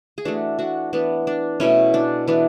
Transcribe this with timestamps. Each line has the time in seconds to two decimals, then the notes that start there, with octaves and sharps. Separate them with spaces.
0.18 G#4
0.25 E3 A3 D4 F#4
0.59 D4 F#4
0.93 E3 B3 D4
1.27 D4
1.60 B2 A3 C#4 E4
1.94 D4
2.28 E3 B3 D4